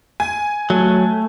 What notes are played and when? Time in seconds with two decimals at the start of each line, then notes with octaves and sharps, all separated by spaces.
0.20 G#5
0.70 F#3 A3